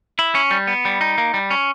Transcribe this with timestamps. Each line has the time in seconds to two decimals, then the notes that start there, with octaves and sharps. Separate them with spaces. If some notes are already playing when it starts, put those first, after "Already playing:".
0.19 E4
0.35 C#4
0.51 G3
0.67 B3
0.85 G3
1.01 D#4
1.18 A#3
1.34 G3
1.51 C#4